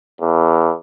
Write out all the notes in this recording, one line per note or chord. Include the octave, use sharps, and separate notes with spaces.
E2